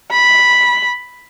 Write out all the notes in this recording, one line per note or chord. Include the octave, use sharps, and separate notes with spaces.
B5